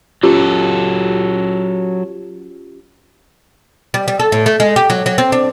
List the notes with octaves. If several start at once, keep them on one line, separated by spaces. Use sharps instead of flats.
F#3 C#4 F4 G4 A4
G3
G3
A4
A2
A3
G#3
G4
F#3
F#3
C4
D4